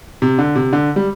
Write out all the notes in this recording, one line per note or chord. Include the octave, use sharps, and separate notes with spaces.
C3
D3
C3
D3
G3